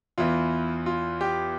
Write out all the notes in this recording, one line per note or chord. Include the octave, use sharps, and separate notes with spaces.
E2 E3 F4
F4
G4